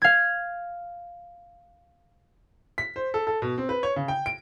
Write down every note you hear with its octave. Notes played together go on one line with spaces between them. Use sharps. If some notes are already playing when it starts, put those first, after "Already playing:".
F5 G#6
B6
C5
A4
A4
B2
C4
B4
C#5
C#3
G5
D7